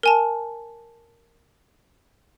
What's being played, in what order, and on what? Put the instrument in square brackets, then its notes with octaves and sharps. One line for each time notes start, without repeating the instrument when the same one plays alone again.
[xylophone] A#4 G#5 A5